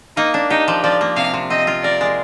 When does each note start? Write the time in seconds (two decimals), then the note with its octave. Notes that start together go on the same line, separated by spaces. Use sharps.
0.17 A#3 D#4
0.34 D4
0.50 D#4 G4
0.68 F3
0.83 F3 D5
1.01 A#3
1.17 C3 F5
1.34 C3
1.50 C4 D#5
1.67 F4
1.83 A#4 D5
2.01 G#3